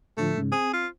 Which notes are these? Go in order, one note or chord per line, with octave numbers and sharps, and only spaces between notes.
A2 D3 F3 A3
G#2 C#3
C4 G#4
F4